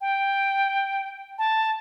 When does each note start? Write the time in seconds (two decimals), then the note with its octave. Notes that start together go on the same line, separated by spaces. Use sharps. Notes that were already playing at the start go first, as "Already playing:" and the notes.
0.01 G5
1.38 A5